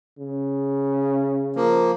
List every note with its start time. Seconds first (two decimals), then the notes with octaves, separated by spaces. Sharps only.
0.19 C#3
1.56 F3 A#3